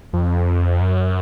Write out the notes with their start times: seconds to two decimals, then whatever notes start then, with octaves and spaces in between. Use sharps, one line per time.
0.13 F2
0.81 F#2